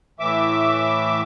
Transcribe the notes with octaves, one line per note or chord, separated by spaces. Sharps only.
A2 E3 E5 D6